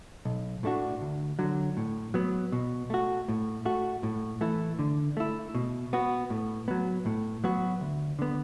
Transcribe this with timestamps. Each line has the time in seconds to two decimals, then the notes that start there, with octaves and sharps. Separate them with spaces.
0.25 B1
0.63 A2 A3 D4 F#4
1.01 D2
1.39 D3 F#3
1.77 A2
2.14 F#3 B3
2.52 B2
2.90 A3 F#4
3.29 A2
3.65 A3 F#4
4.03 A2
4.41 E3 A3 E4
4.79 D3
5.17 A3 E4
5.55 B2
5.93 B3 F#4
6.30 A2
6.68 F#3 B3
7.06 A2
7.44 F#3 B3 F#4
7.81 D2
8.19 D3 B3